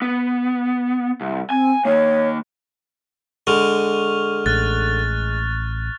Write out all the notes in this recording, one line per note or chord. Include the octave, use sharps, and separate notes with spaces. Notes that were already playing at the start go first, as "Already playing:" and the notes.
B3
C2
C4 G#5
D#3 A#3 C#5
D3 G#3 C#6 F6 F7
A1 F6 F#6 A6